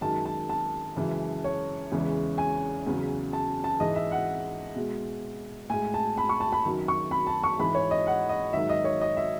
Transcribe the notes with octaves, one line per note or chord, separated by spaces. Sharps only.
F#2 D#3 G#3 A5
A5
A5
F#2 C#3 E3 G#3
C#5
E2 C#3 E3 G#3
G#5
E2 C#3 F#3
A5
A5
G#2 E3 G#3 D#5
E5
F#5
B2 G#3
A2 G#3 G#5
A5
B5
C#6
A5
B5
F#2 D#3 F#3
C#6
B5
A5
C#6
G#2 E3 G#3 B5
C#5
D#5
F#5
D#5
G#2 D#3 F#3 E5
D#5
C#5
D#5
E5